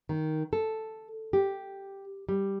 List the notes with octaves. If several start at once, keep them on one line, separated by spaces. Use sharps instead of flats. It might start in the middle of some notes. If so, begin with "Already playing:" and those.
D#3
A4
G4
G3